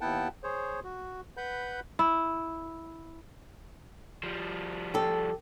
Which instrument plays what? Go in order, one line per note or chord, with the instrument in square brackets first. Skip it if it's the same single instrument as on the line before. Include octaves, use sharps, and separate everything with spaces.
[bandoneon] D#2 B3 E4 F#5 G5 A5
G#4 C5 C#5
F#4
B4 F#5 B5 G6
[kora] E4
[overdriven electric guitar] F3 G3
[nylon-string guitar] G4 A4